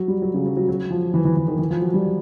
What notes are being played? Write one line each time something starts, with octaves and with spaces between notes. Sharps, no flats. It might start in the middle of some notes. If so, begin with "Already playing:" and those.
Already playing: F#3
G3
F#3
C#3
F#3
F#3
F#3
F3
E3
E3
E3
D#3
E3
F3
F#3
G3